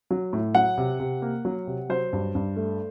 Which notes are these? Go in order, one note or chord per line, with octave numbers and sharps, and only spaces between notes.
F#3
A2
F#3 F#5
C3
C3
A#3
F#3
C3
F#3 C5
G2
G2
A3